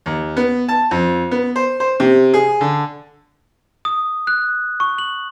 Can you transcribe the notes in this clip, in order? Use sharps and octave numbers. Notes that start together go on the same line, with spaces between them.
D#2
B3
A5
F2
B3
C5
C5
C3
G#4
D3
D#6
F#6
C#6
F#7